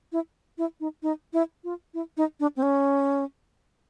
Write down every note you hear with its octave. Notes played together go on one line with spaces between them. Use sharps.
E4
E4
D#4
D#4
E4
F4
E4
D#4
D4
C4
C#4